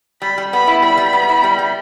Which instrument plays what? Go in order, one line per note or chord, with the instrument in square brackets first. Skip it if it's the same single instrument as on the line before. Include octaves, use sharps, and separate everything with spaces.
[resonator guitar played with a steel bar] G3 [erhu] B5
[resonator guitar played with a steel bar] G3
[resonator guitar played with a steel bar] B3 [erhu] B5
[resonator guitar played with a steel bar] E4
[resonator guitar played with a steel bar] G3 [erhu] B5
[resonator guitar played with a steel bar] G3
B3
E4
G3
G3